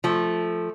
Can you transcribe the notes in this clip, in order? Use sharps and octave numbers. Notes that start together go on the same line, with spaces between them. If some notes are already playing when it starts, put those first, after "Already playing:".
F3 A3